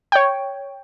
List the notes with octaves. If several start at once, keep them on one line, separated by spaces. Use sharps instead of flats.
C#5 G5